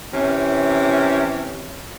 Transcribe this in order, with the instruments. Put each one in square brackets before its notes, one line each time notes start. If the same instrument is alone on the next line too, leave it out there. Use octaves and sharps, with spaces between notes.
[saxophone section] C3 E3 C#4